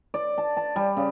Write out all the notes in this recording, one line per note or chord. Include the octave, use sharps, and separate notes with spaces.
D5
A5
A5
G3
C#3